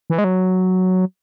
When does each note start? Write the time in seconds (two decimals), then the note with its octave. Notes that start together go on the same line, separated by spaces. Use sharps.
0.10 E3
0.18 G#3
0.24 F#3